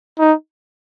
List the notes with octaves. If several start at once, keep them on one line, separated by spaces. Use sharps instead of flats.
D#4